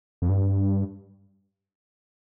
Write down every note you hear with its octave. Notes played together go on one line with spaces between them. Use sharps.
F2
G2